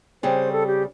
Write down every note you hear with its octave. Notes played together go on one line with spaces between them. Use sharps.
C#3 G3 C4 C5
A4
G4